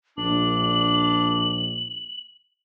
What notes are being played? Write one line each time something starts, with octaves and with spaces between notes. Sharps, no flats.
A#1 D4 F#7